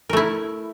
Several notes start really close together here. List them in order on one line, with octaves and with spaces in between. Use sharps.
A#4 A3 E4